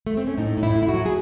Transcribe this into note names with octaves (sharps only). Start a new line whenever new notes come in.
A3
C4
C#4
A2 D#4
A2
E4
A2
E4
F#4
F#3
G#4